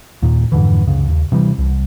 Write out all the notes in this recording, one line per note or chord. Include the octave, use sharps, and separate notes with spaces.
D#2 A#2
F2 G#2 D3 E3
C#2 F#2 C#3
D#2
C3 E3 G3
C2